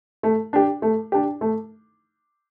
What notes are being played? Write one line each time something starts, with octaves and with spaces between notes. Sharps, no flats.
A3
D4 G4
A3
D4 G4
A3